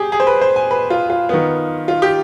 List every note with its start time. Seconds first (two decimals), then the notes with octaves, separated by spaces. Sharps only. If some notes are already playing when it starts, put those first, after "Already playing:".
Already playing: G4 G#4
0.12 G#4
0.20 C5
0.27 B4
0.41 C5
0.56 G#5
0.71 B4
0.90 F4
1.10 F4
1.29 D#3 B3
1.88 F4
2.02 G4